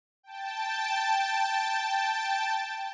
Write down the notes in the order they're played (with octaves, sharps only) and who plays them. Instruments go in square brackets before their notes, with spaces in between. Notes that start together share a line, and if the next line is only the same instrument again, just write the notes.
[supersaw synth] G5 A5